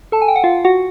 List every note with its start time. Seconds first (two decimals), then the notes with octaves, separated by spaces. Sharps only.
0.12 A4 A5
0.22 G#5
0.28 G5
0.36 F#5
0.44 F4 F5
0.64 F#4 F#5